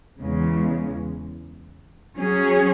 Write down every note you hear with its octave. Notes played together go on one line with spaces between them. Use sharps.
E2 C#3 G#3
F#3 C#4 G#4